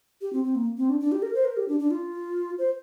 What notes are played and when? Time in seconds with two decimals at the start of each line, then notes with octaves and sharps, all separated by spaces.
0.21 G4
0.33 C4
0.44 C4
0.55 A#3
0.78 C4
0.90 D4
1.00 D4
1.12 G4
1.22 A#4
1.35 C5
1.45 A#4
1.57 G4
1.68 D4
1.80 D4
1.91 F4
2.59 C5